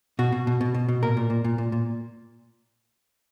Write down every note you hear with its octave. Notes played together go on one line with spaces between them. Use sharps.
B2 F#4
B2
B2
B2
B2
B2
A#2 A#4
A#2
A#2
A#2
A#2
A#2